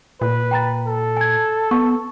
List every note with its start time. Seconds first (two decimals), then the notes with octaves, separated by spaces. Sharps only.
0.21 A#2 B4
0.51 G5 A#5 A6
0.87 A4
1.17 G#5 G#6
1.71 B3 C#6